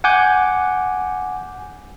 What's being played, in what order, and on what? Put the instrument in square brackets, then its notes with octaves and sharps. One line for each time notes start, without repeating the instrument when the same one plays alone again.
[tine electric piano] F#5 G#5 D6 G6